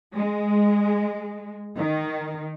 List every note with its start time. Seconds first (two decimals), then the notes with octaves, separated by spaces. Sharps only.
0.14 G#3
1.77 D#3